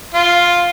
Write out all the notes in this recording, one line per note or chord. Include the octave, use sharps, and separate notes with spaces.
F4